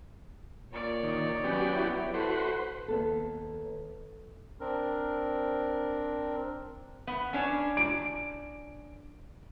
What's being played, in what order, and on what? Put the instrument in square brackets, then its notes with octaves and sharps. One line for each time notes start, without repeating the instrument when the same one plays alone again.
[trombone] A#2 [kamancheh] C#5 D5
[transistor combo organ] D#3
[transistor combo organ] F#3 B3 G4 [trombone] C#4
[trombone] E4
[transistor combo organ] F#4 B4 C5 [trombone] A4
[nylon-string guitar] D#2 B3 A4
[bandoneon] C4 D4 A#4
[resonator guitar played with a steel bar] B3
C#4 D4 C#5
[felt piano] D7